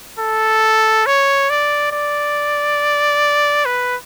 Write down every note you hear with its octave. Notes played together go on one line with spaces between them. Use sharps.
A4
C#5
D5
D5
B4